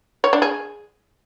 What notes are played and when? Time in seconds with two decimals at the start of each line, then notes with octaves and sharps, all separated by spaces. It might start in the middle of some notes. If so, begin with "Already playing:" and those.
0.24 C#5
0.33 D4
0.42 G#4